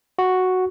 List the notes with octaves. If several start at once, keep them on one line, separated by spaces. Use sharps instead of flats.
F#4